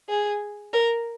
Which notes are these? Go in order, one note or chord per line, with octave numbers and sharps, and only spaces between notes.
G#4
A#4